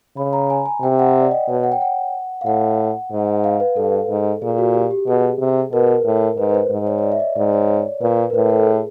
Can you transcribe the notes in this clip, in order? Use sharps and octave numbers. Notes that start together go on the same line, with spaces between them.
C#3 B5
A#5
G#5
G#5
C3 G5
F#5
D5
D#5
B2 C#5
F#5
G5
F#5
F5
A2 F#5
G#2
F5
B4
G2 A4
G#2
A#2 G#4
F#4
G4
G4
B2 G#4
C3
B2 A#4
B4
A#4
A2
G#2 B4
B4
C5
G#2
C#5
C#5
D5
E5
D#5
G#2 D5
C#5
C#5
A#2 B4
A#4
A2 B4
A4
G#4